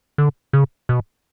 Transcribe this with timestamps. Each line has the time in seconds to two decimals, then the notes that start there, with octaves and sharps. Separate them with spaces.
0.18 D3
0.53 C#3
0.89 B2